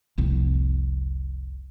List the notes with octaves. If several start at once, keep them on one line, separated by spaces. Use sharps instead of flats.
F1 C2